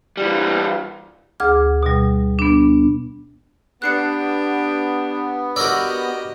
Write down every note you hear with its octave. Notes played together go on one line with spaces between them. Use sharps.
E3 G3
D2 G#4 D6 F6
B2 G3
B3 D4
B3 D4 G4 F#6 C7 C#7
F#4 G4 A#4 D5 D#5 E6